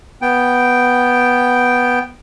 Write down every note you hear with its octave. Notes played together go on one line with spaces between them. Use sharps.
B3 G5